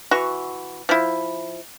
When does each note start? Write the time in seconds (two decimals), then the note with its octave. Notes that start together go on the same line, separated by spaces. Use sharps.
0.11 E3 F#4 C#6
0.89 F3 E4